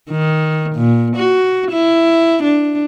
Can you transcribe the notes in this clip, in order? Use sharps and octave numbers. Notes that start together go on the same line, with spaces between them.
D#3
A#2
F#4
E4
D4